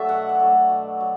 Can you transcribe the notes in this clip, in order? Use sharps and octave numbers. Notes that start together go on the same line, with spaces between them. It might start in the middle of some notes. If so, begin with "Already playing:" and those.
Already playing: F#3 A3 D4 A4 E5
B2 F#5
F#5
F#3 A3 D4
B2
F#3